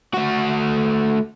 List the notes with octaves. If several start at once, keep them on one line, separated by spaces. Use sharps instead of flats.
A3 F#4